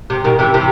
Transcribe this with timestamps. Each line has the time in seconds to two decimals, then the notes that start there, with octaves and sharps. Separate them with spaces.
0.10 C3
0.24 B2 D#3
0.39 C3 E3
0.54 C3 E3